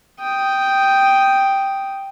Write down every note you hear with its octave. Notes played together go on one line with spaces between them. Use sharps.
G5 D#6